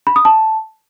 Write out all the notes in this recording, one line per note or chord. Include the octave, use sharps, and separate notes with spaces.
B5
D#6
A5